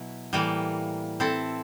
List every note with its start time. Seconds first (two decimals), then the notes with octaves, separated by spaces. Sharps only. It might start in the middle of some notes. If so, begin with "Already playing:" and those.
Already playing: B2 F#3 E4
0.33 A2 E3 G3 A#3
1.20 C4 E4 A4